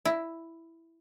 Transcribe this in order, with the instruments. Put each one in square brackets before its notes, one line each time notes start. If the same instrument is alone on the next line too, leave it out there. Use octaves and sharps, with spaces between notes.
[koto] E4